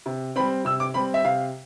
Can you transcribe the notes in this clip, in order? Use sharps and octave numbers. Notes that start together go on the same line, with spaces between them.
C3
G3 C4 B5
C3 E6
D6
G3 C4 B5
E5
C3 F5